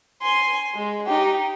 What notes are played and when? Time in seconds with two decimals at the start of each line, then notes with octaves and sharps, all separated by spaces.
0.22 G#5 C6
0.75 G#3
1.06 D#4 G4